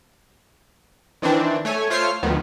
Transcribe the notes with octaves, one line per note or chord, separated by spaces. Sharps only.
D#3 E3 C4 D4
A3 C#5 G#5
A3 F4 C5 C#5 F6 C7
D2 D#3 F3 B3